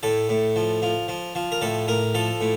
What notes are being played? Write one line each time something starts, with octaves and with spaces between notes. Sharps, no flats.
A2 A4
A2
F3
F3
F3
F3
A#4
A2 A4
A2 A#4
F3 A4
A2